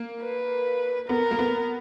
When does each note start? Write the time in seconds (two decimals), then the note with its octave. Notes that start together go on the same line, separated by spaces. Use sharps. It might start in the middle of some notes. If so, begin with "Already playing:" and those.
Already playing: A#3
0.20 B4
1.08 B3 A#4
1.31 A#3
1.39 B3